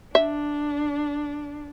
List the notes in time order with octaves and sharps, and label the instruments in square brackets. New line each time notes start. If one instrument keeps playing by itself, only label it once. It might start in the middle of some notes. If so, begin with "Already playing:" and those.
[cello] D4 [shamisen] E5